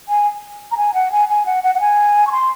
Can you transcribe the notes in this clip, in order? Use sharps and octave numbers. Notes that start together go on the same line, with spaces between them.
G#5
A#5
G#5
F#5
G#5
G#5
F#5
F#5
F#5
G#5
C#6
C6